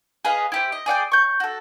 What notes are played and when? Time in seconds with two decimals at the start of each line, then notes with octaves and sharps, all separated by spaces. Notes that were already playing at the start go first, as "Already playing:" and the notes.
0.25 G#4 B4 D#5 F5
0.52 E4 G4 C5
0.72 D#5
0.86 G#4 D5 F#5 G5
1.12 C#6 G6
1.40 F#4 A4